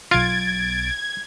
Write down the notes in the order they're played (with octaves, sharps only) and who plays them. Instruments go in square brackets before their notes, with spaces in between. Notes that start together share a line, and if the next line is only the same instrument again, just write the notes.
[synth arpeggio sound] B1 A6 D7 [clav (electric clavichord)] F4 [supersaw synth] G#6